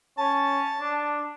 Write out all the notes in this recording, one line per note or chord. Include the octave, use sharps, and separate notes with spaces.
C#4 A5
D4